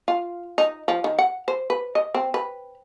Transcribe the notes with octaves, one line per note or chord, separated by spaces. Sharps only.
F4
D#4
F3
D#3
F#5
C5
B4
D#5
C4
B4